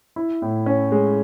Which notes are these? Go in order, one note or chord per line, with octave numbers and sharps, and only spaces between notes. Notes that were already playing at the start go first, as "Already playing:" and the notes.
E4
A2
C#4
G#3